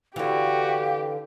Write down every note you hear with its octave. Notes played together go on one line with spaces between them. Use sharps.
D3 E3 F#4 G4 F5